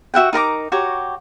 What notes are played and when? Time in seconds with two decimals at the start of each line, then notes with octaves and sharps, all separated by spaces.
0.14 F#4 E5 F#5 G5
0.33 D#4 A#4 A#5 D6
0.72 F#4 G4 C#5 A#5